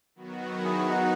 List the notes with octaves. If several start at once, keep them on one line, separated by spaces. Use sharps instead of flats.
D#3 F#3 B3 F#4
E4 G#4
D#4 F#4